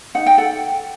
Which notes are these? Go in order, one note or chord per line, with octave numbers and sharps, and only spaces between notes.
D#4 F#5
G5
A4 F#5